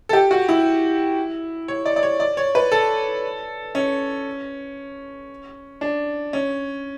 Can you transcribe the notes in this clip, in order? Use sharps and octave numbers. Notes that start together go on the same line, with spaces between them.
A4
G4
F#4
E4
C#5
D5
D5
C#5
D5
C#5
B4
A4
C#4
D4
C#4